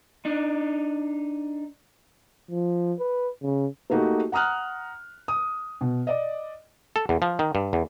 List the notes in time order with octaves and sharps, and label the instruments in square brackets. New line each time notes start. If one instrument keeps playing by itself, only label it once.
[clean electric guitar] D4 D#4
[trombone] F3
B4
C#3
[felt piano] A3 A#3 D#4 F#4 G4
F#5 A#5 D#6 F6 F#6
D#6
B2
D5 D#5
[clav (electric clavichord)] A4
E2
F3
D#3
G2
E2